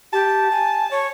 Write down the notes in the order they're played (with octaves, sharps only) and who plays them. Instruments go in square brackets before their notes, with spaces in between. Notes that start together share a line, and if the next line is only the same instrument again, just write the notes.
[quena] G4 [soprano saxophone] A5
[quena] G#5
C#5